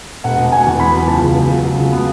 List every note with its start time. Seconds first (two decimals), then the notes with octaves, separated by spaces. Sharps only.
0.24 E1 F#5
0.38 B2
0.52 E1 G#5
0.66 E2
0.80 B3 B5
0.94 F#3
1.08 C#2 A5
1.22 C#3
1.37 C#2
1.50 F#3
1.65 C#2
1.78 C#3
1.93 B3